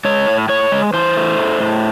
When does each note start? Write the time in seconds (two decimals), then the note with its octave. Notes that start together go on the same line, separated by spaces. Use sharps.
0.05 G#3 C#5
0.27 A2
0.49 A2 C#5
0.72 G#3
0.93 E3 C5
1.16 A3
1.38 A2
1.61 A2